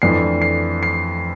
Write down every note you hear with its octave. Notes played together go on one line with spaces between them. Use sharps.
F2 E3 A3 D4 C7
C7
C7